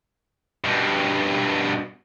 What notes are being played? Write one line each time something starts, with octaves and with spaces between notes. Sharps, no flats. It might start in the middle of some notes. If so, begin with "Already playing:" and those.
G2 B2